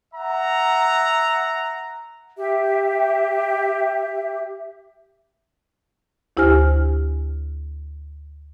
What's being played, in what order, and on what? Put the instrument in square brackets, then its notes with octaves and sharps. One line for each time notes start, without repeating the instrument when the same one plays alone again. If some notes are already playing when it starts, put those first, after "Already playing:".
[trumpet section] E5 F#5 A#5
[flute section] G4 E5
[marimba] D2 E4 G4 C5 G#5 F6